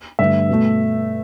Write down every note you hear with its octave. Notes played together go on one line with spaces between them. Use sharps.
G2 D3 A3 E5
B2 A3